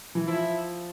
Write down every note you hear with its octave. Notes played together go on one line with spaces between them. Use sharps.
E3
F3 E4